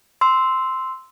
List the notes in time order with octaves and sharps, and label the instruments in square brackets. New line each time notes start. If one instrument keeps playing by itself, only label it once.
[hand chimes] C6 E6